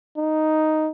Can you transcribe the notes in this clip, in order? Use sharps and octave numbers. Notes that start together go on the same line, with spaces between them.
D#4